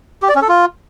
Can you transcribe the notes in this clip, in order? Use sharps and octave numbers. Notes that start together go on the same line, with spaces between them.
G4
D5
C#4
A4
F4